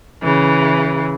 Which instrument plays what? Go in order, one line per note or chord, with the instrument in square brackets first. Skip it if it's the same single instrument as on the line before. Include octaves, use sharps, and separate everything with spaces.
[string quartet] C#3 E3